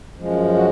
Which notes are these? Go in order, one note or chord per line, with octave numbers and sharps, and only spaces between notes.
F#2 F3 G#3
F#4